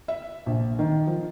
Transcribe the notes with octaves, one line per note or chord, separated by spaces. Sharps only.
E5
A#1
D#3
F3